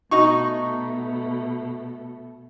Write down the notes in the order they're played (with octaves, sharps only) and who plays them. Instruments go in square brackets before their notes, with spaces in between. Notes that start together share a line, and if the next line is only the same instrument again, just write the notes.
[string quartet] B2 A3 [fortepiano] D#4 F#4 C#6